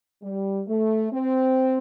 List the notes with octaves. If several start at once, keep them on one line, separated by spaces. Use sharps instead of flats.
G3
A3
C4